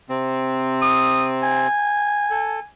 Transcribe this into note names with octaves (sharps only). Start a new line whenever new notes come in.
C3 C4
D#6
G#5
A4